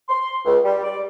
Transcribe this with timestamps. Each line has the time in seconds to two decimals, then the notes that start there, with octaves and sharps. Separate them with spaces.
0.09 C6
0.45 C#2
0.64 G3
0.84 D5